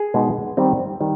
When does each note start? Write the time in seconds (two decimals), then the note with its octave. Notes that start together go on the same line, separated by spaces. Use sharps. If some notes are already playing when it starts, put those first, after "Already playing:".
Already playing: G#4
0.14 B2 G#3 B3 D#4
0.57 D#3 G3 C4
1.00 D#3 G3